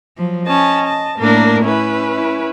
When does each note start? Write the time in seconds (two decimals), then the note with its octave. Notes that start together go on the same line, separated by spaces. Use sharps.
0.18 F3 F#3
0.47 C#4 D#5 A5
0.87 A5
1.19 A2 A#3 D4 A#4
1.64 C#4 E4 B4
2.15 E4